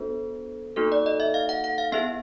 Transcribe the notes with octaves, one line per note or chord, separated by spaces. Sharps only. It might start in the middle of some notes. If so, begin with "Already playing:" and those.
Already playing: B3 D4 F#4 A4 C5
A#3 D#4 F#4 A4
D5
D#5
E5
F5
F#5
F#5
F5
B3 E4 G#4 E5